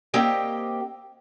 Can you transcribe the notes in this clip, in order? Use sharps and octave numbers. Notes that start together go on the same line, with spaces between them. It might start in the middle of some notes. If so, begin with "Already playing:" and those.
A#3 C4 G4 D#5 G5